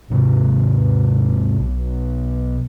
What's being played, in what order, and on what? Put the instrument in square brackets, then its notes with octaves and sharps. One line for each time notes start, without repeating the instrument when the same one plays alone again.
[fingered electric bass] D#2 G#2 C3
B1 B2